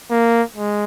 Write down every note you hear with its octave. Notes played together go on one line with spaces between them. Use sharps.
A#3
G#3